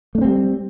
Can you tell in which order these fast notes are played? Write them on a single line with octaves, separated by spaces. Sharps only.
A3 D4 C4 G3